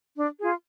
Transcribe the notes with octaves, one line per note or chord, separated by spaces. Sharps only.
D4
F4 G#4